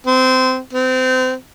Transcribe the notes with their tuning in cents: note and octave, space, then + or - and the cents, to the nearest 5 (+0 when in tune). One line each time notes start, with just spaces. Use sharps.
C4 -20
C4 -30